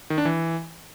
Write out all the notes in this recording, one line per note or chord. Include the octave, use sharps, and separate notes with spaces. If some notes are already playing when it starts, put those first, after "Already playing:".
D#3
D4
E3